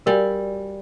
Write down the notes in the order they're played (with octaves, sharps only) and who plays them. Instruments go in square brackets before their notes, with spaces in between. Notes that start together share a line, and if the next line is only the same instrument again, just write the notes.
[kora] G3 [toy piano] F#4 A#4 D5 F5 G#5